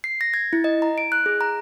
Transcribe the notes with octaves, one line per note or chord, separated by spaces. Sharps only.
C7
A#6
G#6
E4
D#5
A#5
D7
F#6
G#4
A#5